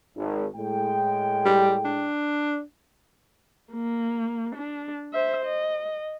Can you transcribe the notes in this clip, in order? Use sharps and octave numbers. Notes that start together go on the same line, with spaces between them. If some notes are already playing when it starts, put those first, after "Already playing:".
G#1
A2 G#3 G5
G3
D4
A#3
D4
C5 E5
D#5